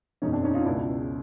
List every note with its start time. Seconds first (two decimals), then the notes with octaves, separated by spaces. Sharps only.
0.22 F#1 E2 B2 C#4 D#4
0.32 C4 D4
0.44 C#4 D#4
0.54 D#4 F4
0.65 C#2 B2 D4 E4